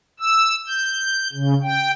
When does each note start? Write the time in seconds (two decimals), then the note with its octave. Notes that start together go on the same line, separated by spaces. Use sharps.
0.20 E6
0.67 G6
1.33 C#3
1.63 G5